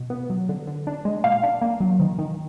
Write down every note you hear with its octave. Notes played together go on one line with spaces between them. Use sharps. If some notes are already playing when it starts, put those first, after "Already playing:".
Already playing: B2
B3
F#3
D3
D3
D4
G#3
A#2 F5
D4
A#3
F#3
D#3
D#3